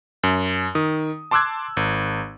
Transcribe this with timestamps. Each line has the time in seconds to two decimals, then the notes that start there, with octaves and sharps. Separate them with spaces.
0.23 F#2
0.75 D#3 D#6
1.31 A5 C6 D6 E6 F#6 G#6
1.77 G#1